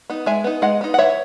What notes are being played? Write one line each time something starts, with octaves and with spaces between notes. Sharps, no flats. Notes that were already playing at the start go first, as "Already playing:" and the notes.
B3 D#4
G#3 E5 G#5
B3 D#4
G#3 D#5 F#5
B3 D#4
F#5
E3 C#5 E5